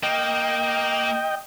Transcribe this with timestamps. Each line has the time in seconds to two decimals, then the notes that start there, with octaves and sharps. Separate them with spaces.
0.03 A#3 D#5 G5